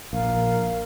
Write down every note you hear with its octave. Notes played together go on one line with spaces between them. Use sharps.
A#1 A#4 F5